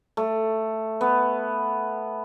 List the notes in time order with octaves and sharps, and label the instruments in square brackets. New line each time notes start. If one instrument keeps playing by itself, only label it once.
[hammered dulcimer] A3
B3